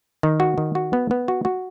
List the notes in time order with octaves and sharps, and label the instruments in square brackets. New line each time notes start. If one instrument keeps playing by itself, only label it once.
[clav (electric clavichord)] D#3
F#4
D#3
F#4
B3
B3
F#4
F#4